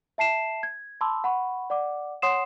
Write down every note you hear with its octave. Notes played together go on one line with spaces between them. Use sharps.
E5 A5 C7 E7
G#6
A5 B5 C6 D6 E6
F#5 B5 C#6
D5 F#5 D6
C#5 F#5 C6 D#6 C7 E7